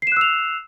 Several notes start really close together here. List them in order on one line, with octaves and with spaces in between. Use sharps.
C7 E7 F#6 E6 F7